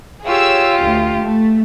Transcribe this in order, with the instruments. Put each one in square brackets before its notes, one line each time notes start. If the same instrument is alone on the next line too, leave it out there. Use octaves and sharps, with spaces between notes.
[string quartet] F4 G4 [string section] G#4 C#5 E6
[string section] D2
A3